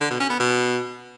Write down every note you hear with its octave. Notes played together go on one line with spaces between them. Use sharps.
D3
B2
C#4
B3
B2